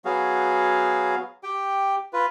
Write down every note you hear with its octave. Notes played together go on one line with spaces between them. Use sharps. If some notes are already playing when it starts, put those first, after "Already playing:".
F#3 B3 F#4 G#4 F5
G4 G5
F4 B4